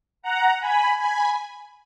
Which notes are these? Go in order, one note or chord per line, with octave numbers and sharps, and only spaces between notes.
F#5 A#5
G#5 B5
G#5 B5